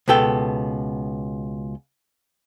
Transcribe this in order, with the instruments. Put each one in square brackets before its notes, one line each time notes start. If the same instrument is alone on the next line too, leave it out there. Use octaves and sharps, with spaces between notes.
[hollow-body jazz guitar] C#2 B2 B3 A4 G5